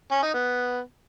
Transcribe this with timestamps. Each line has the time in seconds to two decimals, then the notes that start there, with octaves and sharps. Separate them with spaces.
0.11 C#4
0.22 D#4
0.34 B3